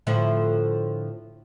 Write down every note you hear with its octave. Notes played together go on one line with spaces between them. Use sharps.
A2 D3 F3